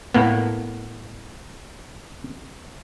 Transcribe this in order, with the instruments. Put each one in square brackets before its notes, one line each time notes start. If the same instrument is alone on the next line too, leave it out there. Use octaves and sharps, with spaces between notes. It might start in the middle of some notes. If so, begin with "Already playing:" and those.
[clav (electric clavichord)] A2 A#3 B3